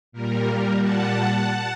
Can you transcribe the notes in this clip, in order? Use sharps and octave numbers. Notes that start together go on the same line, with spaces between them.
A#2 G3 A#4
F#5 A5